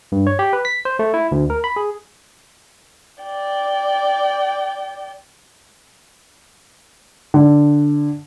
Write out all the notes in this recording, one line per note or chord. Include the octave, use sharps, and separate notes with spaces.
G2
C#5
G4
B4
B6
C5
A3
E4
D2
A#4
B5
G#4
D5 G5
D3